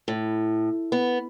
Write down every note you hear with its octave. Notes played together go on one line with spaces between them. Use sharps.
A2
B3